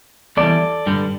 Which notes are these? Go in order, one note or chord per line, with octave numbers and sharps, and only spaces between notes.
E2 E3 G3 A4 D5
G2 D3 G3